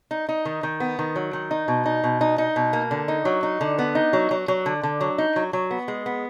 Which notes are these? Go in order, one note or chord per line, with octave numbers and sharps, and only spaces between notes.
D#4
D#4
D#3
D#3
B3
D#3
F#3
D#3
D#4
B2
D#4
B2
D#4
D#4
B2
A#3
D3
D#4
F#3
D#4
D3
B3
D#4
F#3
F#3
F#3
D3
D3
F#3
D#4
F#3
F#3
B3
G#3
B3